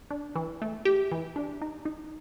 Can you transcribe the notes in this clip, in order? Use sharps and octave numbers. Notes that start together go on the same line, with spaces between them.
D4
E3
A3
G4
E3
D4
D#4
D#4